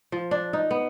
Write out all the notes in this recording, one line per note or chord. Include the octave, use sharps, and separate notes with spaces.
F3
D4
D#4
B3